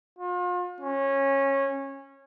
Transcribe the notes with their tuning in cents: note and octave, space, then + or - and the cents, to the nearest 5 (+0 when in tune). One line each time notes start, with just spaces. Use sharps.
F4 +40
C#4 -20